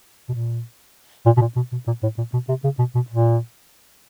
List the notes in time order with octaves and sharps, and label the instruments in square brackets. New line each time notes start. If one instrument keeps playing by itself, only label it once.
[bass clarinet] B2
A#2
A#2
B2
A#2
B2
B2
A#2
A2
A#2
B2
C3
C#3
B2
B2
A#2